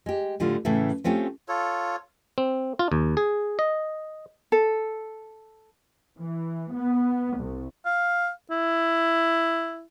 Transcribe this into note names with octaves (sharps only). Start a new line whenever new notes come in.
G#3 G4
A2 D3 G3 F4
A2 C#3 E3 A3
A3 C4 C#4 F4 G4
F4 A4 C#5
C4
F4
D#2
G#4
D#5
A4
E3
B3
C2
F5
E4